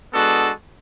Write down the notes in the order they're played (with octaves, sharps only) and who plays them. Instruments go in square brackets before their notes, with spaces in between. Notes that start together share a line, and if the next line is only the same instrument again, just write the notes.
[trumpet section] G#3 B3 D4 F#4 A4